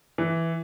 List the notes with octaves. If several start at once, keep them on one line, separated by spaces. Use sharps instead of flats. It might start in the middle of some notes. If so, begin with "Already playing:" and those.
E3